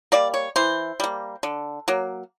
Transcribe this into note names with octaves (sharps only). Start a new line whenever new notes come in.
G3 A#3 D5
C#5
E3 C5
G3 A#3
D3
F#3 A#3